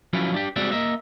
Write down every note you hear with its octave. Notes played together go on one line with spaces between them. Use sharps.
F3 F#3 C#4 E4 B4
D4 G4
G3 G#3 C4 F#4 D5 E5
A#3 D#5 E5